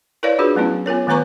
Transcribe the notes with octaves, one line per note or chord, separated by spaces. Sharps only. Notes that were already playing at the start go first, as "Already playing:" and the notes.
E4 A#4 B4 C#5 D5 F5
D4 F4 F#4 G#4 B4
F#3 A3 B3 C#4 E4
B3 F4 A#4 C#5
D#3 A3 B3 B4 A#5 C#6